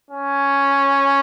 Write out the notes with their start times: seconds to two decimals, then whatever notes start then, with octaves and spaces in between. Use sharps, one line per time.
0.11 C#4